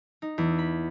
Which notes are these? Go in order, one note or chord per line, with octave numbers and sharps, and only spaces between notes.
D#4
E2
B5